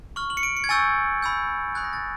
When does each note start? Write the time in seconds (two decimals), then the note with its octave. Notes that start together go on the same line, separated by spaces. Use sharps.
0.16 C#6 F6 F#7
0.30 F#7
0.37 C#7
0.43 D7
0.57 C#7
0.64 G#6
0.69 G#5 C#6 E6 G6 A6
1.22 B5 E6 G6
1.75 B5 D#6 F#6 G#6
1.84 A#6
1.93 A6